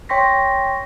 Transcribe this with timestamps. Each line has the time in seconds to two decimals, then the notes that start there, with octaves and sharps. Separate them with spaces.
0.09 C#5 G5 C6 C#6 A#6 B6